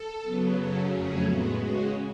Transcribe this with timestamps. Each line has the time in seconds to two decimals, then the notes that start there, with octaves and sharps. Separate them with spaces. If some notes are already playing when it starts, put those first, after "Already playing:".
Already playing: A4
0.22 C#3 F#3 B3
0.56 F#2 C#3 F#3 C#4 A4
0.89 F2 C#3 F#3 A3 C#4 G#4
1.23 A2 G#3 B3 F#4
1.57 C#3 G#3 C#4 F#4